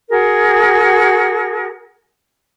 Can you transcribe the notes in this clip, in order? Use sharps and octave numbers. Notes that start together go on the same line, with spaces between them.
F#4 G#4 A#4